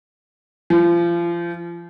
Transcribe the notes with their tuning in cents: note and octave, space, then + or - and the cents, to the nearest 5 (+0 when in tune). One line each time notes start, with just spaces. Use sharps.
F3 -35